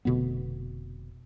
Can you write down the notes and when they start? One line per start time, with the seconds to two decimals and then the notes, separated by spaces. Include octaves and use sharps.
0.05 F1 B2 D3 B3